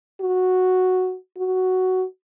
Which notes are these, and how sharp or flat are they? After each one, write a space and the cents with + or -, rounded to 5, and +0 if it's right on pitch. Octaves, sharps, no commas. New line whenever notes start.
F#4 -5
F#4 +5